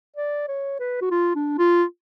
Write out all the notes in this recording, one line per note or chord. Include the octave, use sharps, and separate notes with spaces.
D5
C#5
B4
F#4
F4
D4
F4